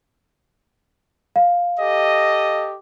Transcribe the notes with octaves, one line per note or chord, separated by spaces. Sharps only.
F5
G4 A4 D#5